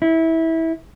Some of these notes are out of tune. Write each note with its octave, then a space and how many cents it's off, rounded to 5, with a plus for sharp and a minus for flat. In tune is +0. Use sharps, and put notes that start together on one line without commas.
E4 -20